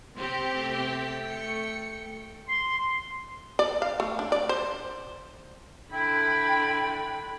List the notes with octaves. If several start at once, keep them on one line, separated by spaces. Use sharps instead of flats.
C3 C4 G4 C5
A3 G5
C#7
C6
D5
F5
A3
D4
D5
C5
D3 E4 G5 B5